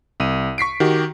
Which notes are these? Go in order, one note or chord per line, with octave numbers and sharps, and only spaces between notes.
C2 D#7
C#6 B6 C7 D7
D#3 F#4 G4